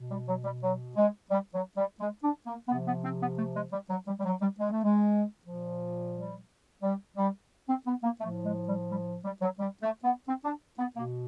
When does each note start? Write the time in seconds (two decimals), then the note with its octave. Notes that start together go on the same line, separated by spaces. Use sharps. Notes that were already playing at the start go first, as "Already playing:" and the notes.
Already playing: B2
0.10 G3
0.28 F#3
0.44 G3
0.62 F#3
0.96 G#3
1.31 G3
1.54 F#3
1.77 G3
2.00 G#3
2.23 D4
2.46 A#3
2.68 C3 F3 B3
2.86 B3
3.03 C4
3.21 B3
3.37 A3
3.55 G#3
3.72 G3
3.90 F#3
4.07 G3
4.19 G3
4.25 F#3
4.41 G3
4.58 G#3
4.71 A3
4.84 G#3
5.44 A#2 F3
6.14 G3
6.83 G3
7.17 G3
7.69 C4
7.87 B3
8.03 A#3
8.20 A2 A3
8.25 F3
8.44 G#3
8.66 G3
8.90 G3
9.24 G3
9.41 F#3
9.59 G3
9.82 A3
10.04 B3
10.28 C4
10.45 D4
10.78 B3
10.96 B2 A#3